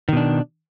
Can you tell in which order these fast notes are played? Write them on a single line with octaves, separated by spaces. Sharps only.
D#3 B2 D4